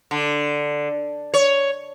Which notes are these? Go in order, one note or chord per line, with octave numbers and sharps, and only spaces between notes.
D3
C#5